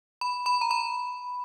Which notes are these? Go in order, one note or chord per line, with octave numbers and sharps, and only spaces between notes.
B5
B5
A#5
B5